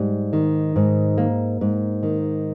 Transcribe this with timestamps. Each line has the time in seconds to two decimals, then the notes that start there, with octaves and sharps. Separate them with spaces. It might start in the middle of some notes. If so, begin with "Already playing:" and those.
Already playing: G#2 G3
0.33 D#3
0.76 G#2
1.18 A#3
1.61 G#2
2.03 D#3